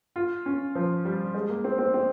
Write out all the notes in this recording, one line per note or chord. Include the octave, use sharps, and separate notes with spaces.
F4
C#4
F3
G3
G#3
A#3
C4
C4
C4